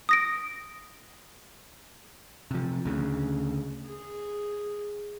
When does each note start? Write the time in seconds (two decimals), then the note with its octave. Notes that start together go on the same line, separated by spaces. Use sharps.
0.09 D#6 A#6 D7
2.51 C3 F3
2.85 D2 C#3
3.87 G#4